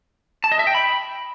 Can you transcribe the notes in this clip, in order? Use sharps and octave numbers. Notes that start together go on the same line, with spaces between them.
A5
D#5
E5
G5
B5